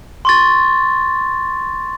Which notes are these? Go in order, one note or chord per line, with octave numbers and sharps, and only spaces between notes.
C6 C#6 A6